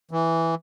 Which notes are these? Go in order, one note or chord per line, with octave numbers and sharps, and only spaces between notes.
E3